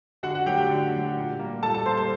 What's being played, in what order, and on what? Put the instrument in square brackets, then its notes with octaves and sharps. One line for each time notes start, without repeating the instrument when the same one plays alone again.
[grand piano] D3 F#4 F#5
F#4 F#5
F#3 A3 G4 G5
G4 G5
D3
F#3 A3
A#2
G3 A#3
A#2 A4 A5
A4 A5
G3 A#3 C5 C6
C5 C6